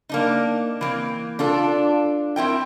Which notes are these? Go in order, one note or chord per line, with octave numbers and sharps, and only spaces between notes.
A#3 D4 D#4
E3 A#3 C4
D4 F4 A4
C4 E4 A#4 G5